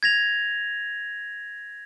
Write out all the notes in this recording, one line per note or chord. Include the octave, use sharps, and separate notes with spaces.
G#6 A#6 F7